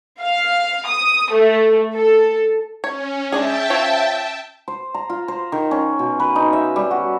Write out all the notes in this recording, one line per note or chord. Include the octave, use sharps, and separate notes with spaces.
F5
D#6
A3
A4
C#4 C#5
G#3 D4 G#4 E5 G5 A5
F4 C5 C#5
C5
A#5
F4
C5
D#3
C#4
B2
B4
D#4
E5
G3
F#4